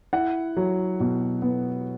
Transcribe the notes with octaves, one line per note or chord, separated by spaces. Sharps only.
E4 F#5
F#3
B2
B3